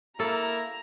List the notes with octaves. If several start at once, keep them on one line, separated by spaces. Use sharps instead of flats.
A#3 E4 A4 A#5